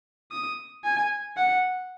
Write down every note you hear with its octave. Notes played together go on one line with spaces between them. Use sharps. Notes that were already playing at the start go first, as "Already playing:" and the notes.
D#6
G#5
F#5